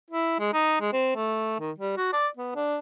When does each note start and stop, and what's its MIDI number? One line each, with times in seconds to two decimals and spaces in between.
0.10 0.37 64
0.39 0.49 56
0.53 0.80 63
0.81 0.91 56
0.93 1.15 60
1.16 1.60 57
1.60 1.71 51
1.78 1.96 55
1.97 2.10 66
2.13 2.28 74
2.37 2.51 59
2.55 2.78 62